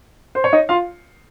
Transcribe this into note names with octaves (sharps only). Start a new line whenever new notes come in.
C5
C#5
D#4 D#5
F4 F5